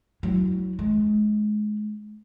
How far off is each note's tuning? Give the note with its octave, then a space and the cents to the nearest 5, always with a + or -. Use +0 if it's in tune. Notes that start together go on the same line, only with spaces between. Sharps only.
F#3 +0 E4 -20
G#3 +25 D4 +0